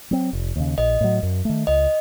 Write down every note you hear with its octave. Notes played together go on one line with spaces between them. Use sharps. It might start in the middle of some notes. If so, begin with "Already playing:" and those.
F#3 C4
F1
D#2 C#3
A#1 D#5
A2 F#3
F#2
D#3 A3
C#2 D#5